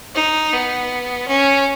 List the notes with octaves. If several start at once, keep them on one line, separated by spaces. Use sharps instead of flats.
D#4
B3
C#4